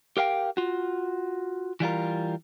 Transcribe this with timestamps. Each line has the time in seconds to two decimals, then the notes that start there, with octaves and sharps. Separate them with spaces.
0.17 G4 A#4 F5 G5
0.57 F4 F#4
1.80 E3 G3 F4 A#4